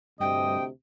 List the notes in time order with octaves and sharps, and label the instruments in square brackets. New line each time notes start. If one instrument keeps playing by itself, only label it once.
[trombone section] D2 C3 [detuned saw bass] G2 [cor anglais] D#5 [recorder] G5